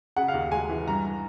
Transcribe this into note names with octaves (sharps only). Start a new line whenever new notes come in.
C#3 F#5
F5
D#2
G#3 G#5
E3
G2 A#5